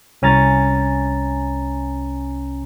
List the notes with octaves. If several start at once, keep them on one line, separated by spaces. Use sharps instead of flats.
C2 C#4 G#5 A#5 A6